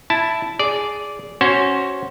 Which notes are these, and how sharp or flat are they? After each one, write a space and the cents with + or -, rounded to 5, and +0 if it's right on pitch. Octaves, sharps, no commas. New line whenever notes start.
E4 +0 A5 +0
G#4 +0 D5 -10
C#4 +0 F#4 +15 C5 +10